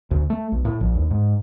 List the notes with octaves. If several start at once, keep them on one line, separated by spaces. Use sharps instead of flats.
D2
A3
B1
A2
A#1
D#2
G#2